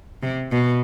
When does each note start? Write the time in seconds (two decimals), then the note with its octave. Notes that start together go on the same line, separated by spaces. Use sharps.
0.23 C3
0.52 B2